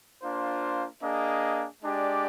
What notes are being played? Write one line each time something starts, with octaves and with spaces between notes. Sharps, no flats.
A#3 D4 F4 C5
A#3 D4 G#4 D#5
G#3 D4 G4 D5